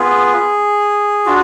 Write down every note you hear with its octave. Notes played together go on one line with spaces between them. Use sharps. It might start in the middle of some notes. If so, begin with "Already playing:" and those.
Already playing: B3 F4 G#4
D4 F4 F#4